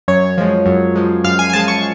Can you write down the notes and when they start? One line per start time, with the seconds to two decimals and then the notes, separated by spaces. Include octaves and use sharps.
0.08 F#2 C#5
0.38 F3 G#3
0.66 F#2
0.95 F3 G#3
1.24 F#2 F5
1.39 G#5
1.50 G#5
1.53 F3 G#3 A5
1.68 C#6